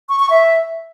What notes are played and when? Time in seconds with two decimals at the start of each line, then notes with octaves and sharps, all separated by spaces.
0.09 C#6
0.20 C#6
0.30 E5